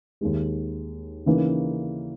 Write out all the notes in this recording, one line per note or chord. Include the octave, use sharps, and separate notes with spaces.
D#2 D#3 G#3
C#3 E3 A#3 D#4